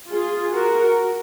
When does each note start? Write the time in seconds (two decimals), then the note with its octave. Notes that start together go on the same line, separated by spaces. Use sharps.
0.10 F4 G#4
0.53 F#4 A#4